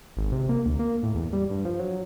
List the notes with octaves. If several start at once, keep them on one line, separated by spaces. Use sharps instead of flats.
G#1
C3
A#3
D2
A#3
A2
E2
G3
G2
F3
F#3